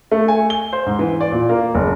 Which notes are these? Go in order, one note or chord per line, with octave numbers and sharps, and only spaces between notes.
A3
G#5
G7
C5
G#2
E3
D5
A#2
A#3
F#1